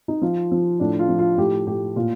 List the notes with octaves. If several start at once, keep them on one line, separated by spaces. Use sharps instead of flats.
D#4
F3 F4
F3
A2 D4
F4
F3
F4
A2 G4
A2 G4
A#2 F4